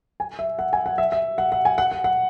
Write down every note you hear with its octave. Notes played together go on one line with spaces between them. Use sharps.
G#5
E5
F#5
G#5
F#5
E5
E5
F#5
F#5
G#5
F#5
F#5
F#5